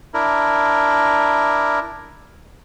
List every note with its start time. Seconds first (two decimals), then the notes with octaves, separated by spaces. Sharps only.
0.14 D4 E4 A#4